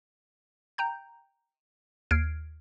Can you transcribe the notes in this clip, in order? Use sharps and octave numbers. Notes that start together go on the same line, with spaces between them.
G5 A#5 G6
D#2 F6 G#6 C7 D7